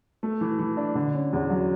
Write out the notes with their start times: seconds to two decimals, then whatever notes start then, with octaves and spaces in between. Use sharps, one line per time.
0.23 A3
0.41 E3
0.59 E3
0.77 D4
0.95 D3
1.14 C#4
1.33 E2
1.50 F#3